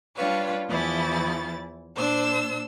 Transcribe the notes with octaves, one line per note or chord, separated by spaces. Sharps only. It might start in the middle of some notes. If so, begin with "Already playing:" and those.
G3 D4 F4 B4 C#5 F5
E2 E3 F3 E4 A6
A#2 D4 C5 E6